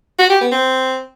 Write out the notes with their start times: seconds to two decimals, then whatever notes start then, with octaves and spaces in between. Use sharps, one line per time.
0.19 F#4
0.30 G4
0.41 B3
0.52 C4